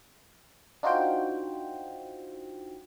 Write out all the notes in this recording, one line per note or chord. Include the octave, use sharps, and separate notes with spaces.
D4 D#4 F4 F#4 C5 G5